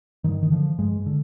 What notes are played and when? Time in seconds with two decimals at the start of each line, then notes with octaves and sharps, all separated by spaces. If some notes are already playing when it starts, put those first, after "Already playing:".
0.24 G2 D#3
0.43 D#3
0.51 D3 F3
0.78 G2 G#3
1.06 D3